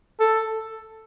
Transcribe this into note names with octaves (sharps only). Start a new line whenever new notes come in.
A4